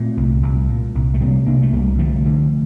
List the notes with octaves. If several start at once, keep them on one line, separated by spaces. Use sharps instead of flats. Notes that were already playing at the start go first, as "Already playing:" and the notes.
Already playing: A#2 A3 C4
C2
C2
A#2
C2
A3
C3 G3 A#3
C3 A#3 D4
A3
C2 G3 A#3
D3 F3 A3
D3